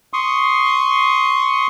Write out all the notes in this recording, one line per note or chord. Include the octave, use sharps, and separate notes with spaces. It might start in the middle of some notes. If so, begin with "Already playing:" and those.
C6 C#6 D#6